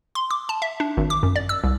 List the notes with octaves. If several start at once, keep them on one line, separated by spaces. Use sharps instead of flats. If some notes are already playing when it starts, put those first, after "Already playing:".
C6
D6
A5
E5
D4
G#1
D6
F#2
D5
E6
C2